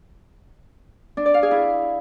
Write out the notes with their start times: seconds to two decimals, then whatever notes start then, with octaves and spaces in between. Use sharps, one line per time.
1.17 D4
1.26 D5
1.34 F5
1.43 G#4
1.51 E4